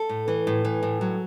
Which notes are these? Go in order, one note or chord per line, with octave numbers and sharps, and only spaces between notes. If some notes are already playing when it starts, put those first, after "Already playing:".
Already playing: A4
A2
E3
A2
E3
A2
F#3